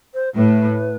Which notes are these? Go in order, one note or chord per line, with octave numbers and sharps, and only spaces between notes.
C5
A2 B4